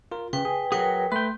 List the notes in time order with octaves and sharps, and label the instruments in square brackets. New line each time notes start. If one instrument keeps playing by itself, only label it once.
[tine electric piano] F4 A#4
[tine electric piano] C#3 [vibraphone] B4 G5
[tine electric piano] G#4
[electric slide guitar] F#3 G#4 [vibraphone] A#4 B4 G5 [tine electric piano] F#5
[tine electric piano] A3 [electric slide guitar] B4 G5 [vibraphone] C6